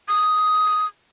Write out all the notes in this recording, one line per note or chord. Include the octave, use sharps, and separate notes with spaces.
D#6